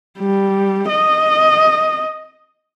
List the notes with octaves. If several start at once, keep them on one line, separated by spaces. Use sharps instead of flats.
G3
D#5